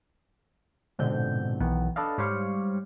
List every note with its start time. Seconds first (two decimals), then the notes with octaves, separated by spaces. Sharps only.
0.99 A#1 G#2 B2 D3 C4 G6
1.60 B1 D#3 E3 B3
1.96 D4 A4 B4 D5 D#5 F5
2.18 G#2 G3 C5 C#5 F5 C#7